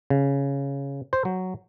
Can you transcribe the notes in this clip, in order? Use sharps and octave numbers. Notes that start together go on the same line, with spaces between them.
C#3
C5
F#3